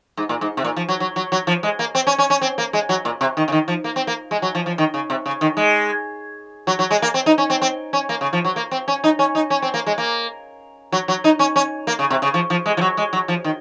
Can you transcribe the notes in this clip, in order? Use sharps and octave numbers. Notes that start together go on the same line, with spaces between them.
G#2
A#2
G#2
C3
A#2
F3
F#3
F#3
F#3
F#3
F3
G#3
A#3
C4
C#4
C#4
C#4
C4
A#3
G#3
F#3
A#2
C3
D#3
C#3
D#3
F3
A#3
C4
A#3
G#3
F#3
F3
F3
D#3
C#3
C3
C#3
D#3
G#3
F#3
F#3
G#3
A#3
C4
D#4
C#4
C4
C4
C#4
A#3
C#3
F3
F#3
A#3
C4
C#4
D#4
C#4
D#4
C#4
C4
A#3
G#3
A#3
F#3
F#3
D#4
C#4
C#4
A#3
C#3
C3
C#3
F3
F3
G#3
F3
F#3
G#3
F#3
F3
D#3